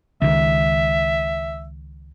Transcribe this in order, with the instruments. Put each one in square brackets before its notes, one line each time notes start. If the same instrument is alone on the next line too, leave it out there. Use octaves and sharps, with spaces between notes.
[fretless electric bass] C#2 D#3 [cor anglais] E5